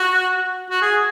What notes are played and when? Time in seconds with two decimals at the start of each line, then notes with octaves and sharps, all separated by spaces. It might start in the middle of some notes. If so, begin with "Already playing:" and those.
Already playing: F#4
0.70 F#4
0.82 G#4